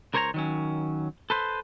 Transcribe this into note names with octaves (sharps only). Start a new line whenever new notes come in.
C#2 A#4 C5 C#5 G#5 A#5
D#3 F#3 C#4
A4 B4 C5